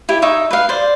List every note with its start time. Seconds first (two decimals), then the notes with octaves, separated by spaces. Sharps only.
0.09 E4 G4
0.22 D#4 E5 C#6
0.51 B4 F5
0.69 C5 D5